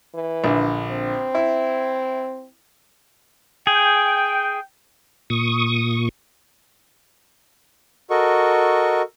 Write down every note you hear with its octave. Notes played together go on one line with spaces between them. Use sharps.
E3
A#1 D3
C4
E4
G#4 G5
A#2 C#6 D#6
F#4 A4 A#4 D#5 C#6